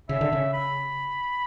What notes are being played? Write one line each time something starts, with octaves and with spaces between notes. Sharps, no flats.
C#3 E5
D3
C#3
B5